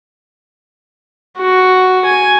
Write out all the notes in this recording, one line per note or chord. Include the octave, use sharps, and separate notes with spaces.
F#4
G#5